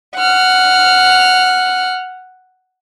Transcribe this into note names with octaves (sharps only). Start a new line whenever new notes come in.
F#5 F6